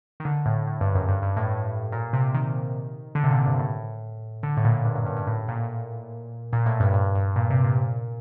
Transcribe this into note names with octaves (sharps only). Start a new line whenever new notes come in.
D#3
D3
A2
A2
G2
F#2
G2
G2
A2
A#2
C3
D#3
D3
C3
A#2
G2
A2
D3
A2
A#2
G2
F#2
G2
G2
A2
A#2
A#2
A2
G2
G2
G2
A#2
C3
A#2